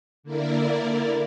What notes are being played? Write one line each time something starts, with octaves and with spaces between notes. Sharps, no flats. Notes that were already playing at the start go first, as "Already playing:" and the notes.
D3 A#3 E4 A#4 D5